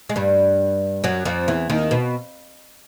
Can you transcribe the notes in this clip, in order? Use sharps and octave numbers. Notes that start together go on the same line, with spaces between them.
G#3
G2 G3
F#2 F#3
F2 F3
E2 E3
D#2 D#3
B2